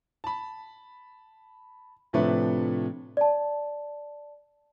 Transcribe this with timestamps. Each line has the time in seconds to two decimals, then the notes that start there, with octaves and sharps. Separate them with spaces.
0.24 A5 B5
2.13 A2 C3 F3 A3 D4 B4
3.17 D5 A5